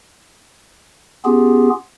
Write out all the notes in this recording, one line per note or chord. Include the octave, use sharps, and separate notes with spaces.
B3 C#4 F4 G4 G#4